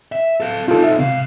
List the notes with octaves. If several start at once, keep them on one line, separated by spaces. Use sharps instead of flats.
E5
A4 F5
C4 D#4 F4 A4
E5
G#2 C3 F5